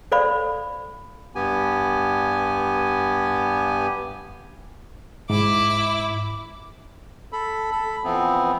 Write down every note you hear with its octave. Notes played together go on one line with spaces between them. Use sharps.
A4 C5 D5 F5 B5
G2 B3 G4 G#5
G#2 E4 D6
A4 B5
A4 B5
E3 F3 B3 C4